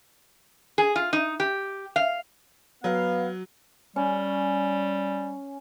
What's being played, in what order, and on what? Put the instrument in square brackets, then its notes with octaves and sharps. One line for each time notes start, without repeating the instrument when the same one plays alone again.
[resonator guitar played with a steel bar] G#4
F4
D#4
G4
F5
[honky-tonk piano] F#3 [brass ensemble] B3 F5
[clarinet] G3 [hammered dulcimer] C#4